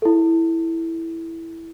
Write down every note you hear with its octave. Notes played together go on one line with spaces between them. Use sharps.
E4 A4